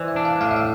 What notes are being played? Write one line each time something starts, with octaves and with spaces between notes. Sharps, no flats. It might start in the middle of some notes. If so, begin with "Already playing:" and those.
Already playing: E3 C5 D5
E5
D4
F5
A2 F5
E5
F5